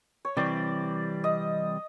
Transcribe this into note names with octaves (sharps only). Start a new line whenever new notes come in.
C#5
C3 E3 G3 C4 D5
D#5